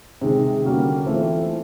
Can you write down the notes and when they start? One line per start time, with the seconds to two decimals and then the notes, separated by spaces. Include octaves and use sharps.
0.21 C3 D#3 G#3
0.64 D3 G3 A#3 C#4 F#4
1.06 E3 A3 C4 F4